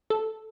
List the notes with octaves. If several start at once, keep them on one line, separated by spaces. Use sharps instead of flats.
A4